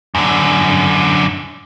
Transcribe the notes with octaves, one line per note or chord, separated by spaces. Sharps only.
F#2 D3